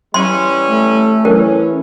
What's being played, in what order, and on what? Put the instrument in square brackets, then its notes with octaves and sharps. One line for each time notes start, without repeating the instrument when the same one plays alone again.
[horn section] E3 G3 C#4 [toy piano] C6
[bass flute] A3
[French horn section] E3 C#4 [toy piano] A#4